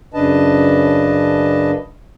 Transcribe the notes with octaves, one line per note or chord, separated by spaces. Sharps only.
F#2 C#3 D4 B4 D#5 A5